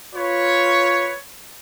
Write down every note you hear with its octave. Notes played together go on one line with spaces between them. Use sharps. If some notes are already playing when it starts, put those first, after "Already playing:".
F4 B4 C#5